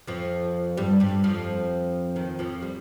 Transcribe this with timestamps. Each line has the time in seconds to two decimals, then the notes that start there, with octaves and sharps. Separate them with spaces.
0.07 F2 F3
0.77 G2 G3
1.00 G2 G3
1.24 F2 F3
2.16 D#2 D#3
2.39 F2 F3
2.62 G3